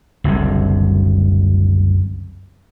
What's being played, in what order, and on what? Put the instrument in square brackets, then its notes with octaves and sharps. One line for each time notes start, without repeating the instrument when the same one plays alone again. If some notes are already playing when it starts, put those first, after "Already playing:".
[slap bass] F#1 C2 F#2 D3